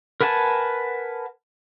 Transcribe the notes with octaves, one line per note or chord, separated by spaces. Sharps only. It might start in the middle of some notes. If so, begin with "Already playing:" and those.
A#4 B4 F#5 G#5 A5